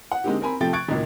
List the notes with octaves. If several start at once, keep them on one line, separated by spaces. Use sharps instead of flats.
F#5
D3 G#3 A#3 C4 D#4 G4
C4 A#4 G#5 B5
C3 F3 A3 G5 A6
C#6 F#6 G#6 A6 D7
G#1 C#2 A#2